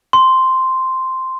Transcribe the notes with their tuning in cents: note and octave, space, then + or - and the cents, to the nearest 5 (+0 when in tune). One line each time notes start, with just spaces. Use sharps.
C6 -5